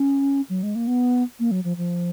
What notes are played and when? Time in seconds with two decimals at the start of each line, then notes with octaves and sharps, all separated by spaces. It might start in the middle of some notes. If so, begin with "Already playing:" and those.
Already playing: C#4
0.49 F#3
0.63 G#3
0.75 A#3
0.87 B3
1.39 A#3
1.51 F#3
1.64 F3
1.77 F3